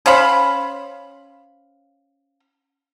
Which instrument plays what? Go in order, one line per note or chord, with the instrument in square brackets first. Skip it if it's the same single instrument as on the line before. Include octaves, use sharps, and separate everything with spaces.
[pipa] C#4 C5 F5 B5